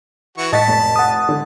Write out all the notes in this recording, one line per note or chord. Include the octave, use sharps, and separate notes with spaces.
E3 F#4 C#6
A2 D#5 A5 A6 B6
F1
F#5 D#6
D3